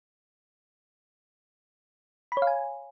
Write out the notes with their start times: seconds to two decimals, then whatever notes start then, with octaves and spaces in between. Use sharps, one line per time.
2.32 B5
2.37 C#5
2.42 F5
2.47 G#5